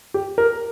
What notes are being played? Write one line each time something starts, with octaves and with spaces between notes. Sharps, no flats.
G4
A#4